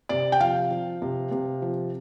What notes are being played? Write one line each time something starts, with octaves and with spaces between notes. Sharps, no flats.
C3 D5
G5
F3 F5
F3
C3
C3
F3